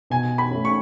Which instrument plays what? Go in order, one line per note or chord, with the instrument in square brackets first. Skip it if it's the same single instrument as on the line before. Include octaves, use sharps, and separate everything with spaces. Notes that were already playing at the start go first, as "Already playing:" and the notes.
[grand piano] B2 [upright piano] G#5
[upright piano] B5
[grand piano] A3 C#4
[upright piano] C#6